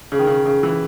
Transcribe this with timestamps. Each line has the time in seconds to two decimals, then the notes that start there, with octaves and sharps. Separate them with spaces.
0.12 C#3
0.19 D#3
0.27 C#3
0.46 C#3
0.63 E3